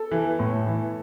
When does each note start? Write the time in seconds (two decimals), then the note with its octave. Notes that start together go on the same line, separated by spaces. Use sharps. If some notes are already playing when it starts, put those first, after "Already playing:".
Already playing: A4
0.11 E3
0.39 A2
0.67 E3